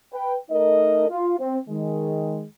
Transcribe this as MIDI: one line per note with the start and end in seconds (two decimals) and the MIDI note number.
0.13 0.36 71
0.13 0.36 79
0.51 1.08 57
0.51 1.08 63
0.51 1.08 70
0.51 1.08 75
1.10 1.39 65
1.40 1.59 60
1.69 2.45 51
1.69 2.45 56